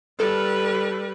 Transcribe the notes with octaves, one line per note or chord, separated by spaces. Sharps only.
G3 A4 B4 F6